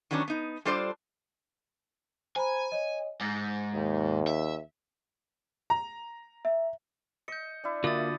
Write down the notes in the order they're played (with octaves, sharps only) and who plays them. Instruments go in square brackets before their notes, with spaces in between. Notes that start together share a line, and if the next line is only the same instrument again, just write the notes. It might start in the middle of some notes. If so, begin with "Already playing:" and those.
[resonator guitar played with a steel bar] D#3 F#3 B3 C#4 D4
B3 D#4
G3 D4 F4 A4 C5 D5
[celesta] C5 A#5 B5 [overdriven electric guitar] G#5
[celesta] C#5 D#5
[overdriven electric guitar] G#2 [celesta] D6 A6 A#6
[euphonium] D#2
[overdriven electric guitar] E5
[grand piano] A#5
[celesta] E5
[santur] D#5 [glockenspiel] G6 C#7
[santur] D4 E4
[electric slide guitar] D3 F4 F#4 [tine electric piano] A#3 E5 [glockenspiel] D6 D#6 A6